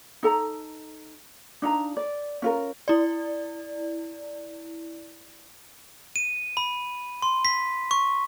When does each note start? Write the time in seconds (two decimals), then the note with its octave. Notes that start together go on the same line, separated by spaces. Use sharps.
0.23 D#4 A4 A#5
1.62 D4 D#4 F4 A#5
1.97 D5
2.42 C#4 F4 A#4
2.88 E4 D5
6.16 D#7
6.57 B5
7.22 C6
7.45 B6
7.91 C#6